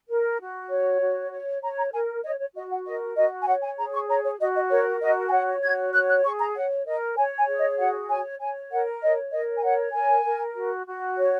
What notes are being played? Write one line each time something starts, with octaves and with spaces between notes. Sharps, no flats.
A#4
F#4
C#5
F#4
C#5
C#5 A#5
A#5
A#4 G#5
C#5 D#5
C#5
F#4 D#5
F#5
A#4 D#5
F#4 D#5
G#5
C#5 F#5
G#5
G#4 A#5
C#6
C#5 A#5
C#5
F#4 D#5
D#5
A#4 C#5
F#4 D#5
G#5
C#5 F#5
F#4 G#6
C#5 F#6
F#6
G#4 C#6
A#5
C#5 F#5
A#4 D#5
C#5 G#5
G#5
G#4
D#5
F#4 F#5
C#5 G#5
C#5 G#5
A#4 F#5
C#5 D#5
A#4 D#5
G#5
C#5 F#5
A#4 G#5
A#4
F#4
F#4
C#5